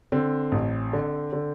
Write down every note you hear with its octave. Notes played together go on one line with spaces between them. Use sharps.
D3 C4
A1
D3
D3